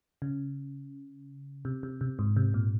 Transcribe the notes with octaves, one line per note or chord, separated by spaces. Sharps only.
C#3
C3
C3
C3
G#2
C3
A#2